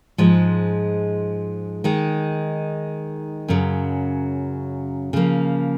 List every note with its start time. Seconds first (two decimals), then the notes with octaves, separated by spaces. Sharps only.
0.18 G#2 F3 G#3
1.84 D#3 G#3 D#4
3.48 F#2 C#3 F#3
5.13 C#3 F3 A#3